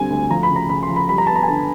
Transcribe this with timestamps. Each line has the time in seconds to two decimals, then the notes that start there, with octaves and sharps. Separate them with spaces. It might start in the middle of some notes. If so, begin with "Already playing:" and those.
Already playing: D3 G3 C4 G#5
0.10 D2
0.30 F3 A#5
0.43 B5
0.50 C#3
0.56 A#5
0.69 C#3 B5
0.83 C6
0.89 F3
0.96 B5
1.09 G3 B5
1.18 A#5
1.27 B3 A5
1.36 A#5
1.43 G#5
1.48 D3 A5